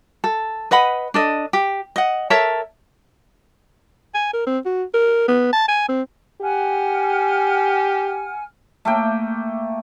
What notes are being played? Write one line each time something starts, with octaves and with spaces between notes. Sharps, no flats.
A4
B4 D#5 F#5 B5
D4 A4 D#5
G4
D#5 F#5
A4 A#4 C#5 E5
G#5
A#4
C4
F#4
A#4
B3
A5
G#5
C4
G4 F#5 G#5 F6
A3 A#3 G5